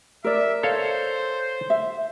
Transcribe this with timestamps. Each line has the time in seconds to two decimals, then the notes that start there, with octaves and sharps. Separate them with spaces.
0.24 A#4 D5 E5
0.63 A4 C5 C#5 F5
1.70 E5